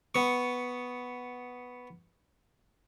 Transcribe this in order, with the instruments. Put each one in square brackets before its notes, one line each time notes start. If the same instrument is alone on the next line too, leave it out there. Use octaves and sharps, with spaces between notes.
[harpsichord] B3 C#6